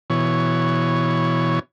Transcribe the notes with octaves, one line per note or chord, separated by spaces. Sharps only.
B2 E3 C#5